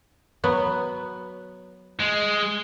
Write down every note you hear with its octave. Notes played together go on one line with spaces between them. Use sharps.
F#3 B3
G#3